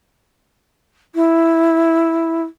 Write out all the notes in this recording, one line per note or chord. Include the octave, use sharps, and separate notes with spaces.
E4